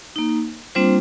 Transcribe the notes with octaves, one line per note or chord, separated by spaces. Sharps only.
A#3 D#4
G3 A#3 C4 D4 F4 C5